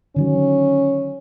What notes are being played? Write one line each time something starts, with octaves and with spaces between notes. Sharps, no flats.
D3 D#3 F#3 C#4